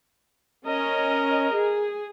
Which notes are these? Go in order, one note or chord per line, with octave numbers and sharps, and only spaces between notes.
C#4 A#4 D#5
G#4